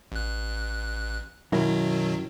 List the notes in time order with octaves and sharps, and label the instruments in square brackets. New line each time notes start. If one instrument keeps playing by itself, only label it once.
[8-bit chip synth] A1 F#6
[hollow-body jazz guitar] F#2 E4 A#4 [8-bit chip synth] B2 D#3 F#3